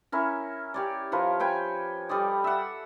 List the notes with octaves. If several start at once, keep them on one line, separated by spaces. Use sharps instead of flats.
C#4 E4 A#4
G4 C#5 D5
F3 A#4 B4 C#6
B4 C#5 G5 G#5
G3 A4 D5 D#5
E5 F#5